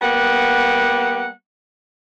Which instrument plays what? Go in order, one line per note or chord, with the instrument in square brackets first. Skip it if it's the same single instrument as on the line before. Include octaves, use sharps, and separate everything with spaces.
[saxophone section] G3 A#3 B3 F#5